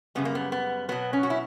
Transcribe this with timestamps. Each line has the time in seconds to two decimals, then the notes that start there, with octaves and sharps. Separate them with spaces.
0.15 F#2 C#3 G3 B3
0.25 A#3
0.35 B3
0.52 B3
0.89 B2 F#3 B3
1.13 C#4
1.23 F#4
1.30 E4